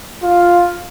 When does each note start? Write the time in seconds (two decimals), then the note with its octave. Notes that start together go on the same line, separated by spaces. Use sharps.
0.23 F4